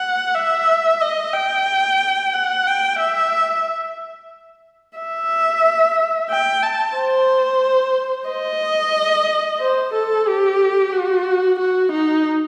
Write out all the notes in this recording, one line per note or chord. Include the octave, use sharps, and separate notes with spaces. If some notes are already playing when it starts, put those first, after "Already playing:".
Already playing: F#5
E5
D#5
G5
F#5
G5
E5
E5
G5
A5
C5
D#5
C5
A4
G4
F#4
F#4
D#4